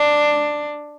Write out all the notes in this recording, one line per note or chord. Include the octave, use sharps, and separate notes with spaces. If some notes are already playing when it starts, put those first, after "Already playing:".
Already playing: D4